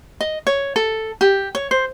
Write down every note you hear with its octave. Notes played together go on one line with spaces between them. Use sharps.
D#5
C#5
A4
G4
C#5
C5